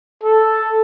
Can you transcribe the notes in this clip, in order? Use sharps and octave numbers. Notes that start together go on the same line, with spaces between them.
A4